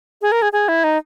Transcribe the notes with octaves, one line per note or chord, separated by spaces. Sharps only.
G#4
A#4
G#4
G#4
E4
D#4